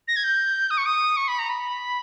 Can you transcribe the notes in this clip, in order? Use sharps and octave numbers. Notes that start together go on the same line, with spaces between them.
A#6
G#6
G6
D#6
C#6
D#6
C#6
B5
A#5
B5